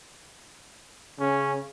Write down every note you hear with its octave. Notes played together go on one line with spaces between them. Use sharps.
C#3 C#4